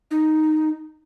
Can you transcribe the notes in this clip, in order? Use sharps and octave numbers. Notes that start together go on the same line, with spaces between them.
D#4